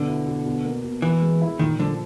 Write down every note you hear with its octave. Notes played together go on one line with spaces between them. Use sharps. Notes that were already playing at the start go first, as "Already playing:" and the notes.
Already playing: B2 D3
E4
B2
B2
A#3
B2
E3 E4
G#3
E4
A#2 D#3
D3 F3